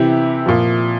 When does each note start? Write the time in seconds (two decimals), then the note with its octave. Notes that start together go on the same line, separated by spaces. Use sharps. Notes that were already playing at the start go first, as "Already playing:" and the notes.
Already playing: C3 E3 E4 G4
0.46 A#2 F3